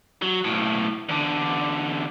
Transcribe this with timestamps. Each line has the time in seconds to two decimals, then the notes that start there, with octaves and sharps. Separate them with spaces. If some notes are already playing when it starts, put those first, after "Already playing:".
0.22 F#3
0.44 B1 A2
1.09 E2 D3